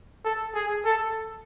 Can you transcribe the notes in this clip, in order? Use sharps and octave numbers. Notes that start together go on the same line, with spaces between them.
A4
G#4
A4